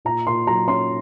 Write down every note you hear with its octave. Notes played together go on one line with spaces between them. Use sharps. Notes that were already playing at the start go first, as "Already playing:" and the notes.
A#2 A#5
A#2 C6
F#3 A#5
C#4 C6